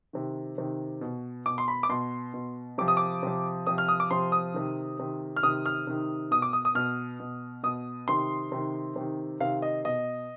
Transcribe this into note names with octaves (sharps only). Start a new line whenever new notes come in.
C3 D#3
C3 D#3
B2
B2 D6
C6
B5
D6
B2 C6
B2
C3 F3 D6
D#6
D6
C3 F3
C3 F3 D#6
F6
D#6
D6
C3 F3 C6
D#6
C3 D#3
C3 D#3
F6
C3 D#3 D#6
F6
C3 D#3
B2 D#6
D6
D#6
D#6
B2 F6
B2
B2 D#6
C3 D#3 C6
C3 D#3
C3 D#3
C3 D#3 F5
D#5
B2 D#5